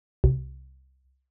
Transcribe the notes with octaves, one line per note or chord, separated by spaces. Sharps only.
C2